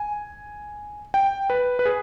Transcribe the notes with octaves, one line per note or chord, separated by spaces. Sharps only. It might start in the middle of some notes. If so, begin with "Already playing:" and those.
Already playing: G#5
G5
B4
B4
G#4